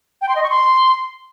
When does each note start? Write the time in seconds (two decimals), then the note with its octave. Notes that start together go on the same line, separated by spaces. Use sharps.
0.22 G5
0.29 C6
0.36 D#5
0.43 C#6
0.50 C6